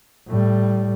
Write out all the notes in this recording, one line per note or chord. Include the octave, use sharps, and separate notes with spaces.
A2 G3